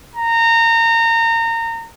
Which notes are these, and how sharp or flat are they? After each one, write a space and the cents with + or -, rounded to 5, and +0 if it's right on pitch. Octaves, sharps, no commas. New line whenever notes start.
A#5 -25